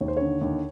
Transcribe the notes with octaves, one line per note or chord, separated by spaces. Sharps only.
D#2 C#5
C5
D3 C#5
D#2